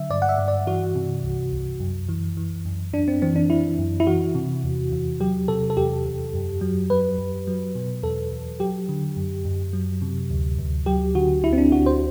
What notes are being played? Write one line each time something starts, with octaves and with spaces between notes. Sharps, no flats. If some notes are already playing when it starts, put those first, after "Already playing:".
Already playing: D3 F#3 E5
G2 D5
F#5
E5
G2
D5
E3 F#4
C3
C2
C2
F#2
E3
E3
F#2
F#2 D4
C4
E3 C4
D4
E3 E4
F#2
E4
E3 F#4
C3
E2
E2
F#3 G4
C3 A4
A4
E2 G4
E2
F#2
F#3
F#3 B4
F#2
F#3
B2
E2 A4
E2
F#3 G4
D3
F#2
F#2
F#3
C3
D2
D2
F#3 G4
D3 F#4
D2 E4
C4
D4
D2 F#4
C5